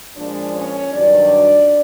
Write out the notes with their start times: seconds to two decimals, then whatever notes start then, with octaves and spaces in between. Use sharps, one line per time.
0.17 A#2 F3 G#3 D4 D5
0.54 C#4 C#5
0.93 G2 D#3 F#3 D4 D5